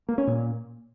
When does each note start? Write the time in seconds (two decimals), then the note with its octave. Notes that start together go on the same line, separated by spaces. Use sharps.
0.09 A#3
0.18 C#4
0.27 A#2